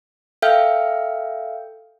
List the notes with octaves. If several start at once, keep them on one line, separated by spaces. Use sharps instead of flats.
A4 E5 F5 G5 F6 G6